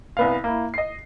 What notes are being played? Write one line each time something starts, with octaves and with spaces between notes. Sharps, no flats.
C2 B3 F5
A#3 E4
D#5 C7